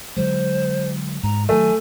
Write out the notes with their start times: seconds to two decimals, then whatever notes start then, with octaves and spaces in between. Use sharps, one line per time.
0.17 D3 F#3 G#3 C5
1.23 G#2 A#5
1.49 D#3 F#3 A3 G#5